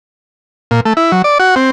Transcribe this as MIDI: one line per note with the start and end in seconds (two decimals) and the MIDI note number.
0.71 0.80 46
0.85 0.93 57
0.97 1.12 64
1.12 1.22 54
1.24 1.38 74
1.39 1.55 66
1.56 1.71 60